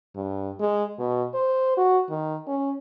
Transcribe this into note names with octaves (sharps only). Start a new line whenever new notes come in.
G2
G#3
B2
C5
F#4
D#3
C#4